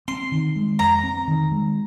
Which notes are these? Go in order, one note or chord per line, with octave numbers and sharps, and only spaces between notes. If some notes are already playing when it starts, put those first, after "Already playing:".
C4 C6
D#3
G#3
F2 A#5
C4
D#3
G#3